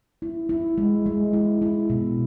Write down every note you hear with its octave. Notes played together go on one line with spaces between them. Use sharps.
E4
E4
G#3
G#3
E4
E4
B2